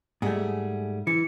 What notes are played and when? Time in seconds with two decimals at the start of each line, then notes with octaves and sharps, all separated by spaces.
0.22 G#2 G3 A3 G#4 F#5
1.07 E3 C#7